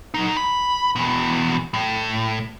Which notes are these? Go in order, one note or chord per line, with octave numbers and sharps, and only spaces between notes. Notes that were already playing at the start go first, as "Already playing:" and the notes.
F#3 D#4
B5
E2 B2
A2